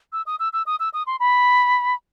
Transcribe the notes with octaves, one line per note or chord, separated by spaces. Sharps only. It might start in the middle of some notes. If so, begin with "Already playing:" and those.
E6
D#6
E6
E6
D#6
E6
D#6
C6
B5